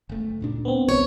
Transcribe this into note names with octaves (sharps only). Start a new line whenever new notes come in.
F#1 A3
D2 A#2 D4
B3 C4
C2 C#5